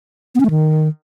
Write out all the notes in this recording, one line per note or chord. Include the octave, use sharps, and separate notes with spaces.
B3
C#4
A3
D#3